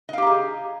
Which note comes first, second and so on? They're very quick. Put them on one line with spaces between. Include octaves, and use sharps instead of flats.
D#5 F5 G4 A#5 G#4